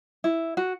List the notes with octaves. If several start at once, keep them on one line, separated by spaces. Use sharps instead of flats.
E4
F#4